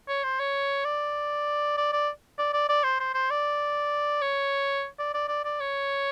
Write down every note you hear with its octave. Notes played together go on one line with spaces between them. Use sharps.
C#5
C5
C#5
D5
D5
D5
D5
D5
D5
C5
C5
C5
D5
C#5
D5
D5
D5
D5
C#5